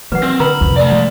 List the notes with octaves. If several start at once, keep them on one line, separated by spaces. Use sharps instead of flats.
E3 F#3 A#3 B4 F#5
C4
D3 A#4 B4 A#5 B5
F2 C3
A3 D5
F3 G#3